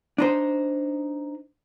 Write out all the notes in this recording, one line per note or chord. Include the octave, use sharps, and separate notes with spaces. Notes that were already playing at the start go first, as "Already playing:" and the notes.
D4 D#4 C5